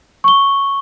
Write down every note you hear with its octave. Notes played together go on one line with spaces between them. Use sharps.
C#6 G7